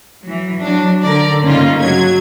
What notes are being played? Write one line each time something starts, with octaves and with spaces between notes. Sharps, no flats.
E3 F#3
F#3 D4
D3 A#4 D5
G2 C#3 A#3 C#4 D#4 F4
F#3 G#6